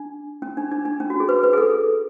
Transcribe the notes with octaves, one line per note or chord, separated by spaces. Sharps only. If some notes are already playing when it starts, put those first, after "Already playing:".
Already playing: D4
C#4
D4
D4
D4
C#4
F#4
G#4
B4
B4
G#4
A4